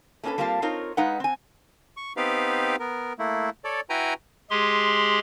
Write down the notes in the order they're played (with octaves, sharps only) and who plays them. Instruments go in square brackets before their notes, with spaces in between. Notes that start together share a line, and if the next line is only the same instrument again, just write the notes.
[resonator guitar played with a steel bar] A3 A#3 C#4 F4 A4 B4
G3 A#3 C4 F4 A5
C4 D#4 F4 A#4 C#5
G#3 D#4 B4 F5 F#5
C4 G#5
[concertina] C#6
B3 C4 D#4 G4 B4 F5
B3 A#4
A3 A#3 E4
A4 C#5 D5
E4 F#4 B4 G5 G#5 A#5
[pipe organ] G#3 G4 G#4 C6